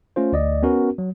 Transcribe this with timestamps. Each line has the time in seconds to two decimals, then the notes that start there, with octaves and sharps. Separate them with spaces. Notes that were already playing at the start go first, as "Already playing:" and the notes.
0.16 A3 C#4 F4 C5
0.33 D2 D5 D#5
0.63 B3 C#4 F#4 A#4
0.98 F#3